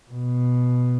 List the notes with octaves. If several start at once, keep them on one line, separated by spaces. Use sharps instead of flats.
B2